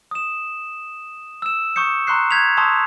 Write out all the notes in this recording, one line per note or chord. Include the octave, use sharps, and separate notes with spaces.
D#6 E7
E6 E7
C#6 D#6 G6 C#7
A#5 C6 C#6 F#6 C7
G6 G#6 B6 F7
A5 C6 C#6 D#6 E6